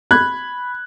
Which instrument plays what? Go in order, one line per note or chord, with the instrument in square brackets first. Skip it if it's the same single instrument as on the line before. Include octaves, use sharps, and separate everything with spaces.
[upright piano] B5 F#6 G#6